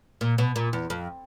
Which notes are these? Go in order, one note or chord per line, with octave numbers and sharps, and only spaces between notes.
A#2
B2
A#2
E2
F2